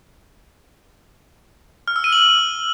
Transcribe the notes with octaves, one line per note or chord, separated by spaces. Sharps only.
F6
E6
D#7
F#7